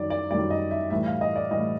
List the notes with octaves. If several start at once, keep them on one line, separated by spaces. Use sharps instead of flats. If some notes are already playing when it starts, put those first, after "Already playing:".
Already playing: F#2 D#3 G3 D5
D5
F#2 D#3 G3 D5
D#5
E5
A2 E3 G3 E5
F5
D#5
D5
A2 E3 G3 D#5